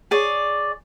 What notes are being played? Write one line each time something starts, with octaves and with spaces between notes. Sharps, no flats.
G#4 C#5 D5